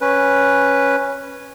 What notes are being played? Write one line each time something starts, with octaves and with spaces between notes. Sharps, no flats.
C#4 B4